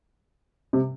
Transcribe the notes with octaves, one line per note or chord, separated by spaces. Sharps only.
C3